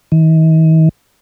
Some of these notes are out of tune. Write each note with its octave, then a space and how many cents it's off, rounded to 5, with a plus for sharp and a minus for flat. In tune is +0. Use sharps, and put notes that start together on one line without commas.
D#3 +45